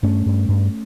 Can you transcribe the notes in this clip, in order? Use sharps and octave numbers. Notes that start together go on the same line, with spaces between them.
G2 A3 C#4
G2
G2